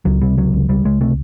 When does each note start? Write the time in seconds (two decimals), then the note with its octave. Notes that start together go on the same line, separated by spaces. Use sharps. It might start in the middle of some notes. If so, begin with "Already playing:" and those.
0.05 C#2 F#3
0.21 C3 G3
0.37 C#2 F#3
0.53 C#2
0.69 C#2 G3
0.84 C#2 G#3
1.01 C3 A3